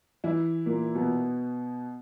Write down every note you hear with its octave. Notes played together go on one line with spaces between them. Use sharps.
E3 E4
A#2 A#3
B2 B3